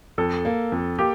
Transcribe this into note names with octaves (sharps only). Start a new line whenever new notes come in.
F2 A4
A#3
F2
A#3 G4